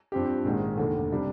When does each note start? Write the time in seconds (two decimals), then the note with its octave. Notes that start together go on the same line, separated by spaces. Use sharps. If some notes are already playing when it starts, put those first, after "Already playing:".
0.12 G2 F3 C4 G4
0.45 A#1 G#2 D#3 G#3
0.77 F1 D#2 D3
1.12 C3 G3 D4